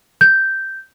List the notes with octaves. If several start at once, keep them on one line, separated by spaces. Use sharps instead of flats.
G6